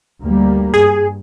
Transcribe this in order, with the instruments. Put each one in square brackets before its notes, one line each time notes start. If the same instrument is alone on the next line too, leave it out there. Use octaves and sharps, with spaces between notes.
[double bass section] D2 G3 A#3
[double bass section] G2 [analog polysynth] G#4